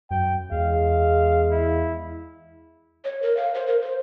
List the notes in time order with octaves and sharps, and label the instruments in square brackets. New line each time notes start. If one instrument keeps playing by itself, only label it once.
[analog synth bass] F#2 [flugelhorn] G5
[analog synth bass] E2 [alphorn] G#3 [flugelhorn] F5
[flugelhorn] E4
[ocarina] C#5
A#4
F5
C5
A#4
C5